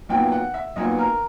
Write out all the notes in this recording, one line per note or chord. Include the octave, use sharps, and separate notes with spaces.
B1 A#2 F#3 B3 G5
F#5
E5
B1 A#2 F#3 B3 D#5
A#4